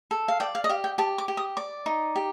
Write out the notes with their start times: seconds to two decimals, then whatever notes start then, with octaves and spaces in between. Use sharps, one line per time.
0.11 A4
0.28 F5
0.40 D5 G5
0.55 F5
0.64 D#5
0.69 G4 F5
0.84 G5
0.98 G4 A5
1.18 D6
1.28 G4
1.37 D#6
1.57 D5 D6
1.86 D#4
2.16 G4